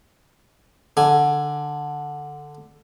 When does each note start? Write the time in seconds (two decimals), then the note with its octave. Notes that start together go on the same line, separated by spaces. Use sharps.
0.97 D3 G#5